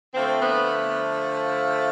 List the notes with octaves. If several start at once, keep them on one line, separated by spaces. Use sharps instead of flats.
D3 F3 A3 C4
B3